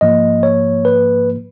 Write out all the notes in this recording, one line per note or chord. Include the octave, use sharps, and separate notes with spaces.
G#2 F3 A#3 D#5
C#5
B4